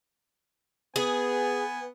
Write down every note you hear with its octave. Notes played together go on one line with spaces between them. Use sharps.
B3 G#4 G#5